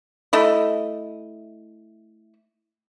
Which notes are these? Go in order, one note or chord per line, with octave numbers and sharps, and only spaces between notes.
A3 E4 D#5